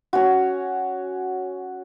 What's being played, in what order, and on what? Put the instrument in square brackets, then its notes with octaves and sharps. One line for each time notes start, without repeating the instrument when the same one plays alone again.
[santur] C#4 F#4